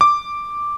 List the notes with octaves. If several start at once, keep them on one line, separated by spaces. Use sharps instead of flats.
D6